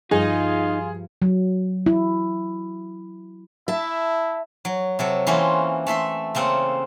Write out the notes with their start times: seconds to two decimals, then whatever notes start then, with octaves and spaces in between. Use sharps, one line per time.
0.11 G2 F3 D#4 F4 G#4
1.22 F#3
1.86 E4
3.68 E4 E5 A5
4.65 F#3
4.99 C3 F#3 A4
5.27 E3 A#3 C4 C#4 F4 F#4
5.87 A3 A4 E5 C6
6.35 C#3 A#3 C4 A4 F#5